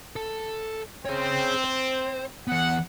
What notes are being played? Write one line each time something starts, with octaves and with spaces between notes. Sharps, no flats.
A4 A5
C4 G#4 C#5
C5
E3 B3 F#5